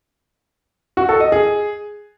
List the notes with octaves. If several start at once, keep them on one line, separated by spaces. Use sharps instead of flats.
F#4
A4
D#5
G#4